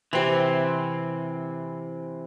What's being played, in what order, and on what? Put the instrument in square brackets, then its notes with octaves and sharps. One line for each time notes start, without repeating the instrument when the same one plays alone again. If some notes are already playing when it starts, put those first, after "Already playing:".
[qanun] C3 C5 [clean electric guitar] E3 C4